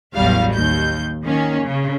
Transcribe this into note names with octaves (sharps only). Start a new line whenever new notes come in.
A1 E2 F#3 G3 F5
D#2 G6
D#3 A#3 C#4
C#3